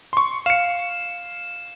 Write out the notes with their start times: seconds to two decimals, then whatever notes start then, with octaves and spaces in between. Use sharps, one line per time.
0.13 C6 C#6
0.46 F5 C#7 E7